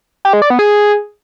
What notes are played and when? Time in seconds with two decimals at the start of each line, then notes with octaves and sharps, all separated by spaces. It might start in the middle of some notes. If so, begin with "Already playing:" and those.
0.25 G4
0.33 G#3
0.42 D5
0.50 B3
0.59 G#4